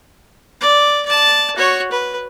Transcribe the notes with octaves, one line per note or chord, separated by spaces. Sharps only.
D5
D5 A5
F#4 C#5
B4